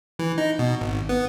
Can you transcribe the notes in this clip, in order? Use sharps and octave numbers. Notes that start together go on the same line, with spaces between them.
E3
D#4
B2
G#1
B3